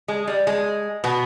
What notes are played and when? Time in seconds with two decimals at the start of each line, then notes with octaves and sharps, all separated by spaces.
0.08 G#3
0.27 G3
0.47 G#3
1.04 B2 B3